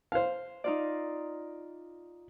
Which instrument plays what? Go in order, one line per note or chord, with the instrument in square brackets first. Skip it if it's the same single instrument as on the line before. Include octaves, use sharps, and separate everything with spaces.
[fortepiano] C5 F5
[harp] D#4 F4 D5